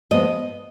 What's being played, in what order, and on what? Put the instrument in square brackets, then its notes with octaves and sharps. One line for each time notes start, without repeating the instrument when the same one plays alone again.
[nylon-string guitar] G2 F3 G#3 B3 D#5